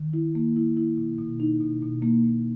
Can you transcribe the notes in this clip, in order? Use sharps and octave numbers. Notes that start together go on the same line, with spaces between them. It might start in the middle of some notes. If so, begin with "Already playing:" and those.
Already playing: D#3
E4
A#3
E4
E4
B2
B2
D#4
B2
B2
A#3
A#3